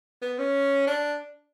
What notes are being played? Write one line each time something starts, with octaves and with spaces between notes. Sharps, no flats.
B3
C#4
D4